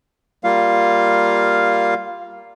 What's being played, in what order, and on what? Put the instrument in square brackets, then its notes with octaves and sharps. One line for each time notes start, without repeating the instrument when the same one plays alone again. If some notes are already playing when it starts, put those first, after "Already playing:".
[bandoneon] G3 A#3 F4 F5